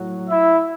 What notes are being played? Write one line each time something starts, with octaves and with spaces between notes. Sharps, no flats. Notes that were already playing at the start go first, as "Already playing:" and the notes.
Already playing: A2 F#3
E4 E5